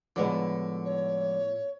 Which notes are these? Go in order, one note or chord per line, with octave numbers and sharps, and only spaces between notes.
A2 D3 F3 G#3 B3 E4
C#5